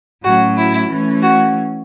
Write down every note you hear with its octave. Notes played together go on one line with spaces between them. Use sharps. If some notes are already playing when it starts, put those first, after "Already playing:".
A2 F#3 C#4 F#4
E4
E3 A3 C#4
F#4